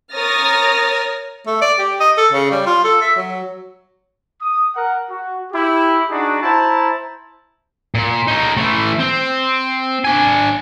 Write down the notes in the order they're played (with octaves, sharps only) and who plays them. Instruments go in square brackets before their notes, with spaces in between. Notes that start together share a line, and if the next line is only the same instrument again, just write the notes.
[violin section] A#4 C#5 D#6 F6 A6 A#6
[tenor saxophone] A3
D5
G4
D#5
A4
C#3
G3
F4
A4
E5
F#3
[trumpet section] D#6
A#4 F#5
F#4
E4 G4
D4 D#4 F#4 G#4
E4 C5 A5 A#5
[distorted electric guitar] A#2
D#4 C#5
E3 A3
C4
D4 G#5